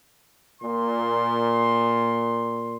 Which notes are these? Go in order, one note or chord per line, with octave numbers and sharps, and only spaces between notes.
A#2 C6